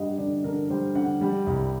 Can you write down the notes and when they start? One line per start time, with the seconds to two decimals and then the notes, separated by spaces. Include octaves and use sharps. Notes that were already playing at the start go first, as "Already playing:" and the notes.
Already playing: G2 G3 D#5 F#5
0.18 D3 D5
0.44 D3 A#4
0.70 G3 C5
0.95 D3 F#5
1.21 G3
1.47 C2